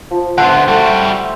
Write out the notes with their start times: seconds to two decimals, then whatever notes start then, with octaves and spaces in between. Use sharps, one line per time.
0.11 F3
0.38 D3 B3 C5 E5 F#5 C6
0.68 G3 A3 F#4